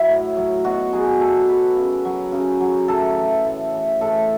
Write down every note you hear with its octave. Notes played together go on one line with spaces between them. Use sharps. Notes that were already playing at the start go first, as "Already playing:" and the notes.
Already playing: F#3 E4
A2
F#3
B2 F#4
F#3 G#4
B2 A4
F#3 B4
C#3
F#3
C#3
F#3
A2 A4
E3
A2
E3
A2 A4